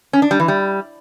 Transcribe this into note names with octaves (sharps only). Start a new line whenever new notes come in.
C#4
D4
G3
E3
G3